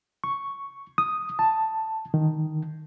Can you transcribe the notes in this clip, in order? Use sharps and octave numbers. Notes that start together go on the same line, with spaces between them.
C#6
D#6
A5
D#3